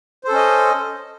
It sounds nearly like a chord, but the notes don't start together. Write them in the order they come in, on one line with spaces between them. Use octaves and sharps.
C5 A4 C#4 D#5